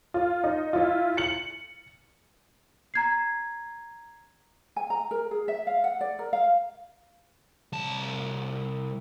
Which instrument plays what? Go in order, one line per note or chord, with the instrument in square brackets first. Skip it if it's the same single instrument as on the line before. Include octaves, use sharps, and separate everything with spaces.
[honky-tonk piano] F4
D#4
E4 F4
C#7 F#7
[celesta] A#5 G#6 C7
[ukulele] G#5
A#5
A#4
G#4
E5
F5
F#5
D5
A#4
F5
[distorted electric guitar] C2 A5